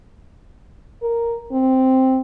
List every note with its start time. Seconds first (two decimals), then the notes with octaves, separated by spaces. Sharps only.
1.02 A#4
1.52 C4